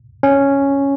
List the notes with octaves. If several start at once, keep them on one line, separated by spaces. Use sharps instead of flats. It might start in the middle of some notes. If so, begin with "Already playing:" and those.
C#4